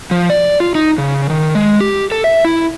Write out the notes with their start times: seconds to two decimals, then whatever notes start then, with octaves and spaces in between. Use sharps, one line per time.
0.11 F3
0.30 D5
0.60 F4
0.75 D#4
0.98 C#3
1.30 D#3
1.55 G#3
1.81 G4
2.12 A4
2.24 E5
2.45 E4